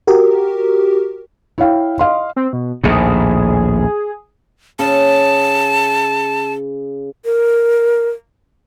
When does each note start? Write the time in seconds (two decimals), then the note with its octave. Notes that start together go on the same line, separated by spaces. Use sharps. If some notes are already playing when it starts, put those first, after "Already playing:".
0.07 F#4 G4 A#4
1.58 E4 C#5 F5 G5
1.99 D#5 F5 C6
2.36 C4
2.53 B2
2.84 A#1 D#2 A2 G#4
4.79 C#3 A5
7.25 A#4